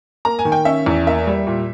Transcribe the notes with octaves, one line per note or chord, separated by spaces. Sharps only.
A#3 A#5
G#5
D#3
G5
C#4 E5
E2
A#3 E5
G3
A#2